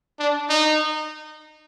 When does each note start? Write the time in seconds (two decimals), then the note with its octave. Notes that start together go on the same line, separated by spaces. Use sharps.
0.19 D4
0.49 D#4